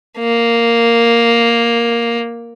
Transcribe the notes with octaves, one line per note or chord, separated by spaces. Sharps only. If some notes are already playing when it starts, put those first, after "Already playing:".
A#3